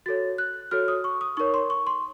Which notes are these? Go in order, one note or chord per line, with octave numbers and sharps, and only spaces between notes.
F#4 A4 C#5 A6
F#6
F#4 A4 C#5 F6
D#6
C#6
D#6
D#4 A#4 C#5 C#6
C6
C#6
C6